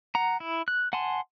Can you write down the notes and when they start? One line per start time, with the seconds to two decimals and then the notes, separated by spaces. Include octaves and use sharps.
0.15 F#5 A#5
0.40 E4
0.68 F#6
0.93 F#5 G#5 A5 C6